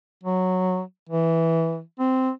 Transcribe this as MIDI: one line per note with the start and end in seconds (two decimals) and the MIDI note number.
0.23 0.81 54
1.09 1.81 52
1.99 2.30 60